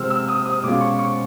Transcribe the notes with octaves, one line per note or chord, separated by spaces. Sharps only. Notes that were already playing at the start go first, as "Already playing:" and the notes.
Already playing: C3 F3 G#3 C4 E6 F6
E6
D#6
D#6
B2 G#3 C#4 F4 D6
C#6
C#6